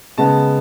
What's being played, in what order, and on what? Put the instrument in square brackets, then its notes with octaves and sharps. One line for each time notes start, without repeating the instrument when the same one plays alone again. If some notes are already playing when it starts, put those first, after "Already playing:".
[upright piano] C#3 G#3 B3 A5